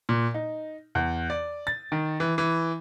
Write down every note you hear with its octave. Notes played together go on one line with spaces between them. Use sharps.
A#2
D#4
E2
D5
A6
D#3
E3
E3